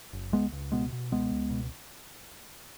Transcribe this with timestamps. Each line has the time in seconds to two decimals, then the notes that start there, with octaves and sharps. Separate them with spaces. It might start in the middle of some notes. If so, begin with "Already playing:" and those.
0.13 F#1
0.32 C#2 G#3 B3
0.52 C#2
0.72 B2 G#3 B3
0.93 B2
1.11 C#2 G#3 B3
1.31 C#2
1.50 B2